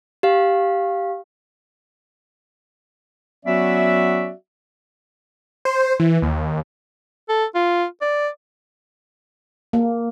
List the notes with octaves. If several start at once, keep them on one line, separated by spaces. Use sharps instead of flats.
G4 F5
F#3 B3 C#4 F#4 D5 E5
C5
E3
D#2
A4
F4
D5
A#3